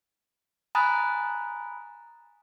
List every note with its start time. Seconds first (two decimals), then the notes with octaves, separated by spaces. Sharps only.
0.75 G#5 A#5 B5 D#6 F#6 A6